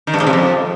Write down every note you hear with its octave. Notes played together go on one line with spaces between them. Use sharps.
D#3
G2
G#2
C3
F2